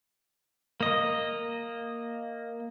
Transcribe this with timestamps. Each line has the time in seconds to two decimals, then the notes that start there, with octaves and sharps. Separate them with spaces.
0.81 A#3 D#5